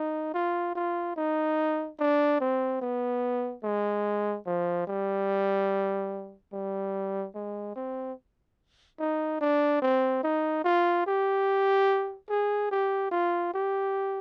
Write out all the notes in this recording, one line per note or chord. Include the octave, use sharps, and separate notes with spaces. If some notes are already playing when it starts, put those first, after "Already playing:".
Already playing: D#4
F4
F4
D#4
D4
C4
B3
G#3
F3
G3
G3
G#3
C4
D#4
D4
C4
D#4
F4
G4
G#4
G4
F4
G4